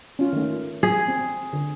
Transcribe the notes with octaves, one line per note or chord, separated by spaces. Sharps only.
C#4 F4
D#3 A3
G#4
C4
D3